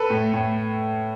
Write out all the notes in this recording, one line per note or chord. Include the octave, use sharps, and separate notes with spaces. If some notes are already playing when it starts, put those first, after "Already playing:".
Already playing: A4 B4
A2
A2